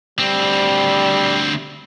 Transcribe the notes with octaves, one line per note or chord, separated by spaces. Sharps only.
D2 G3 C4